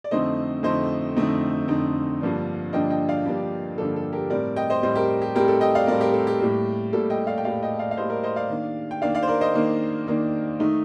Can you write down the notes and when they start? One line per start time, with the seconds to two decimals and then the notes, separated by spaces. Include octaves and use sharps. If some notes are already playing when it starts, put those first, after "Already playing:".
0.04 D5
0.11 F2 D3 A3 C4 D#4 C5 D#5
0.63 F2 D3 A3 C4 D#4 C5 D#5
1.16 F2 D3 A3 C4 D#4
1.68 F2 D3 A3 C4 D#4
2.21 G2 D3 F3 A#3 D4
2.73 G2 D3 F3 A#3 D4 D#5 G5
2.90 D#5 G5
3.09 D5 F5
3.25 G2 D3 F3 A#3 D4 G4
3.78 G2 D3 F3 A#3 D4 A4
3.96 A4
4.12 G4 A#4
4.30 A2 G3 C4 A#4 D5
4.56 D#5 G5
4.70 C5 D#5
4.83 A2 G3 C4 C5 D#5
4.95 G4 A#4
5.22 G4
5.35 A2 G3 C4 G4 A#4
5.48 A4
5.61 D#5 G5
5.75 D5 F5
5.87 A2 G3 C4 A#4 D5
6.01 G4 A#4
6.13 A4
6.27 G4
6.39 A2 G3 A#3
6.93 A2 G3 A#3 A4
7.10 D#5 G5
7.27 D5 F5
7.38 G5
7.45 A2 G3 A#3 D5 F5
7.63 D#5 G5
7.79 D5 F5
7.91 F5
7.97 A2 G3 A#3 C5 D#5
8.10 A#4 D5
8.23 C5 D#5
8.36 D5 F5
8.50 D#3 A#3 D4
8.91 G5
9.02 D#3 A#3 D4 D5 F5
9.15 D5 F5
9.23 C5
9.28 A#4 D5
9.41 C5 D#5
9.55 D#3 A#3 D4
10.07 D#3 A#3 D4
10.60 D#3 A3 D#4